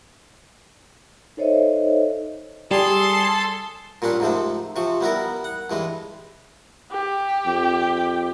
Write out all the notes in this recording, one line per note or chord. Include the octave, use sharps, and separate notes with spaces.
D#4 A4 C5 C#5 D#5 E5
G3 G#4 A4 C6
A#2 G3 C#4 D4
G#2 C3 F3 A3
C3 F3 C#6
G3 B3 E4 A#4
F#5
G2 E3 G#3
G4
F2